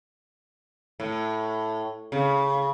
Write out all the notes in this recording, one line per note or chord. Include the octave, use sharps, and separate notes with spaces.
A2
C#3